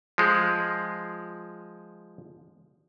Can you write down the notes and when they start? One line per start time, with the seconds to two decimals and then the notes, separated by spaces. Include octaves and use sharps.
0.18 F3 G#3